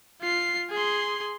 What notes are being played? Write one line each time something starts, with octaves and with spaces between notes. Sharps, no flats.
F4 C7
G#4 C6